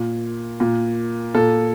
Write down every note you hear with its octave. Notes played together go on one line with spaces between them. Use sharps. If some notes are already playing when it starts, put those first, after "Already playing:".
Already playing: A#2
A#2
A#2 A4